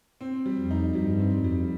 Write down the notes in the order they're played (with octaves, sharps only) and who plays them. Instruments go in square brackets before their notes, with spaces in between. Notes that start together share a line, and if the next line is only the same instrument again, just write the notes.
[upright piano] C4
G3
[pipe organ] F2
[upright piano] D#4
[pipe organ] G2 [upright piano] G3
[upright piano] C4
[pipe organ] F2
[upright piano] G3